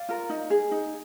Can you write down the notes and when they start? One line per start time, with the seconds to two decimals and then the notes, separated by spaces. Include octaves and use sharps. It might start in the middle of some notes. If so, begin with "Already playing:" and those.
Already playing: D5 F5
0.09 F4 A#4
0.30 D#4
0.50 G#4
0.71 D#4